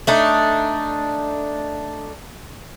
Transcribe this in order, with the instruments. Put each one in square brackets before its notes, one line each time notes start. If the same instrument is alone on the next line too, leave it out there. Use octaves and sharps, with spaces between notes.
[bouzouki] A3 D4 D#4